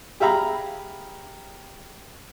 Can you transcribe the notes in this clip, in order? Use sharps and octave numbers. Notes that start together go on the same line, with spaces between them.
G4 G#4 E5 F5 A#5 B5